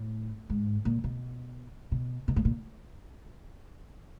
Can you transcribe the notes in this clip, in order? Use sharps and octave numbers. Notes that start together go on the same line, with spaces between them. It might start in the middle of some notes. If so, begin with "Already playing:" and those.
Already playing: A2
G#2
A#2
B2
B2
B2
A2
A#2